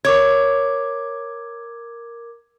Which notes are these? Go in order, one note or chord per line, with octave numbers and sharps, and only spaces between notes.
A#4 C#5 D6 G#6